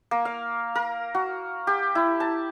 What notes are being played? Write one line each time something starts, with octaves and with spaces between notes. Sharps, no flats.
A#3
F5
A#4
F#4
G4
E4
A5